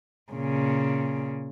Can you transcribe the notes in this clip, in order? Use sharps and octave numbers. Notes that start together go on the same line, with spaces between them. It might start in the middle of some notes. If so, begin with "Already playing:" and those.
A#2 C#3